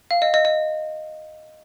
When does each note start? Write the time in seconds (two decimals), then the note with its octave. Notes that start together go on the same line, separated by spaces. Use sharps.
0.11 F5
0.22 D#5
0.34 D#5
0.45 D#5